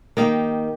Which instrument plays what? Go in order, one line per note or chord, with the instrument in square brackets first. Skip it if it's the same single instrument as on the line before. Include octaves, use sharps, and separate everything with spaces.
[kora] D#3 A#3 D#4 G4